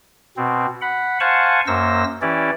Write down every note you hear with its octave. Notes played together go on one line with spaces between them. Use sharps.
B2 C4
F#5 B5
C5 F5 F#5 G#5 A5 C#6
F#2 A#3 C5 E6 A#6
E3 C#4 E4 G4 D5